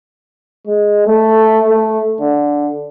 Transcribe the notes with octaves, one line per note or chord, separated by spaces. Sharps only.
G#3
A3
A3
D3